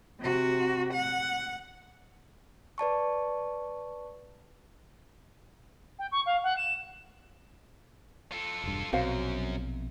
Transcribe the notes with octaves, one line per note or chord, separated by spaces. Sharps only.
C3 F#4
F#5
B4 D5 A5 C#6
G5
C#6
F5
F#5
E7
F4 A4
E1 G2
A#1 F#2 B2 C4 F#4 C5 F5